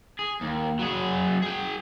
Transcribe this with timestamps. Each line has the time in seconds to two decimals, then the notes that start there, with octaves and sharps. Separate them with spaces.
0.19 G#4
0.41 D#2
0.79 F#3 G#4
1.43 G#4 G5